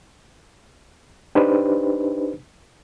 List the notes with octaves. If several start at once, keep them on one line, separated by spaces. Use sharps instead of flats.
D4 D#4 G4 B4 C5